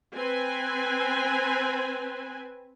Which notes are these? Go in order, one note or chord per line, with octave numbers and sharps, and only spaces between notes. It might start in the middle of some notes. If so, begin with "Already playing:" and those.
C4 B4 G#5